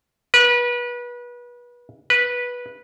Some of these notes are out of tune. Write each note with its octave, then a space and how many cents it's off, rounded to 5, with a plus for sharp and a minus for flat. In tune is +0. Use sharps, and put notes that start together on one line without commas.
B4 -30
B4 -15